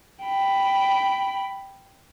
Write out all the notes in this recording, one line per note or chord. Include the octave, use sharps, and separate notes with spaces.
G5 B5